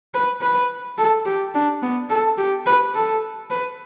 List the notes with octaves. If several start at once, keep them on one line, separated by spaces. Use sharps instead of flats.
B4
B4
A4
G4
D4
B3
A4
G4
B4
A4
B4